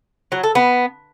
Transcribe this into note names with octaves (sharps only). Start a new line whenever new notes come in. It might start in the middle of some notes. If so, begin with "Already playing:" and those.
F#3
A4
B3